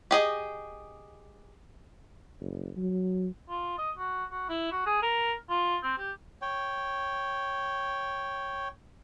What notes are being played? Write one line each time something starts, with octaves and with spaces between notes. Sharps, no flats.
G4 G#4 D#5
F#1
F#3
F4
D#5
F#4
F#4
E4
F#4
G#4
A#4
F4
C4
G4
C#5 G5